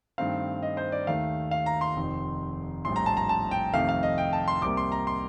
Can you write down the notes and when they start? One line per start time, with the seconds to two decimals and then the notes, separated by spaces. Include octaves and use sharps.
0.18 G2 D#3 A3 C4 F5
0.63 D#5
0.77 C5
0.92 D5
1.07 D#2 D#3 A3 F5
1.51 F5
1.66 A#5
1.81 C6
1.96 F1 F2 D#3
2.85 A#1 A2 G3 C6
2.96 A#5
3.06 A5
3.17 A#5
3.29 A5
3.51 G5
3.74 F2 C3 D#3 A3 F5
3.89 F5
4.03 D#5
4.18 G5
4.33 A5
4.48 C6
4.62 C2 C3 G3 A#3 D6
4.77 C6
4.92 A#5
5.07 C6